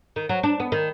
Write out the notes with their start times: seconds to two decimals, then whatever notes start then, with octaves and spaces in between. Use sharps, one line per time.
0.16 D#3
0.29 F#3
0.43 D4
0.60 B3
0.72 D#3